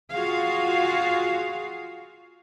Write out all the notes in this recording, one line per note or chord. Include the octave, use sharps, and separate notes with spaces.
F4 F#4 G#4 F5